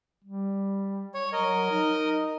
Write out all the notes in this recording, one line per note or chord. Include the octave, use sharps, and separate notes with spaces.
G3
C#5
F#3 A#4 D#5
D#4